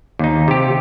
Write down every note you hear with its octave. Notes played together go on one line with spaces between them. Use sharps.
D#2 D#4
C3 G4